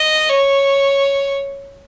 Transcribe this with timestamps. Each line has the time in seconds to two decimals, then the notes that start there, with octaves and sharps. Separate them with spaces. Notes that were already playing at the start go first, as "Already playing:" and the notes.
Already playing: D#5
0.29 C#5